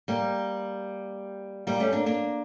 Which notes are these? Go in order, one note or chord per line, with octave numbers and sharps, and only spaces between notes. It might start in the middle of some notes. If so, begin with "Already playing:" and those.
G3 A#3
G3 A#3
A3 C#4
A#3 D4
A#3 D4